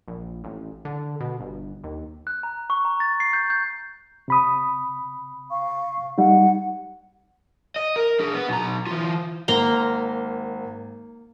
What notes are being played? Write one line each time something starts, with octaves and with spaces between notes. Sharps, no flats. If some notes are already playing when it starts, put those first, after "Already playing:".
A#1
A1
D3
B2
G1
D#2
F#6
A#5
C#6
A#5
A6
C7
G6
G6
C3 B5 D#6
F5 C#6
G3 D#4 F#5
D#5
A#4
D4 G#4
B3
B1 A#5
E3 F4
G#1 A#3 A#5 C6